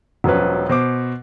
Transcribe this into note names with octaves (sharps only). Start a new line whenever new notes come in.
E1 F3 F#3 C#4 B4
B2 C5 D6